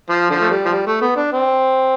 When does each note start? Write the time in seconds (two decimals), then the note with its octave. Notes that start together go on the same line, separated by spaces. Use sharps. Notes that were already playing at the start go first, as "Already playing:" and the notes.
0.09 F3
0.30 D3 F3
0.40 A3
0.50 G3
0.65 F3
0.70 G3
0.87 A3
1.01 B3
1.16 D4
1.33 C4